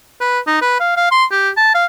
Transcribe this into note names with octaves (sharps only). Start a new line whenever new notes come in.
B4
D#4
B4
F5
F5
C6
G4
A5
F5